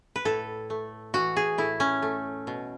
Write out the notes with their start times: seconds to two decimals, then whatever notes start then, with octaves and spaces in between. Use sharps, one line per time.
0.16 B4
0.25 A2 A4
0.70 A3
1.14 E3 F#4
1.37 G#4
1.58 A2 E4
1.80 C#4
2.02 A3
2.47 B2